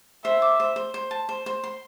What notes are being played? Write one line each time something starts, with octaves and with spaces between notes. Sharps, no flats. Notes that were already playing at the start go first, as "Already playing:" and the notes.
C5 E5
D6
C5
C5
C5
A5
C5
C5
C6